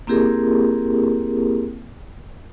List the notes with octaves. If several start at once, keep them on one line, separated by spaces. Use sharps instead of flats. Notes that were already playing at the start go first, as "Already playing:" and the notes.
A#3 C4 E4 G4 G#4 A#4